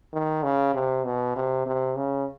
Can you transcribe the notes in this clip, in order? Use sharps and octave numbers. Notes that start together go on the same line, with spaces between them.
D#3
C#3
C3
B2
C3
C3
C#3